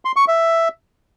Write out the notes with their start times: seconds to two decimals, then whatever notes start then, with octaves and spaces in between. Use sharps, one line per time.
0.05 C6
0.16 C#6
0.28 E5